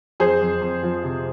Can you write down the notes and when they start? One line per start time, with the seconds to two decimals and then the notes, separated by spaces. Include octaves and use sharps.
0.20 F2 G#4 C5
0.41 F2
0.61 F2
0.83 F3
1.04 C3